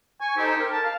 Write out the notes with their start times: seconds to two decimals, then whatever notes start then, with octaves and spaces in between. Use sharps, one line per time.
0.21 G#5 C#6
0.37 D#4 G4 A4 C5
0.59 A#4
0.72 A5
0.85 F5